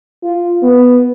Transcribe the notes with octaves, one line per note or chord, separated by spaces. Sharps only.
F4
B3